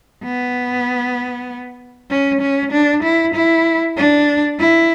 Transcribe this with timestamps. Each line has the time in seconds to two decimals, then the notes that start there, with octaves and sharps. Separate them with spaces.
0.24 B3
2.10 C#4
2.42 C#4
2.72 D4
3.03 E4
3.34 E4
3.97 D4
4.59 E4